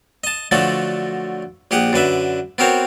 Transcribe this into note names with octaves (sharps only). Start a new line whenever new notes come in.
D#5 A5
D3 F3 F#3 A3 F#4 A4
A#1 G4 G#4 F#5
F#2 D3 B4 E5
B3 C4 F#4 A#4 C5 C#5